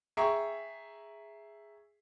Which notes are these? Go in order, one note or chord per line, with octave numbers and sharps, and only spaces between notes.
G#4 E5 G5 A#5 C#6